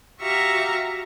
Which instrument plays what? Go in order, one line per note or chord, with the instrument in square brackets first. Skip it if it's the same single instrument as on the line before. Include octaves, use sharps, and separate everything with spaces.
[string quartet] F#4 G4 E5 F5 A#5 C#6